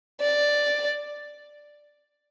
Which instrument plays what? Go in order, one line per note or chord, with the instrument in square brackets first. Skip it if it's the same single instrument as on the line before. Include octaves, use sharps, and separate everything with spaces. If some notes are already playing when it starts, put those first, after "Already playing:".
[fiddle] D5